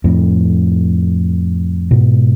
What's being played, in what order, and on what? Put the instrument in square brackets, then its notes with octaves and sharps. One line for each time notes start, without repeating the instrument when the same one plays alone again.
[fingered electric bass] F2 A2
G#2 B2